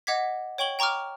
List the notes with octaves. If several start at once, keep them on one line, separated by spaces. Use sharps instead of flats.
D#5 F#5 D6 G#6 B6
C#5 G5 C#6 F#7 G7
G5 A#5 C#6 D6 F6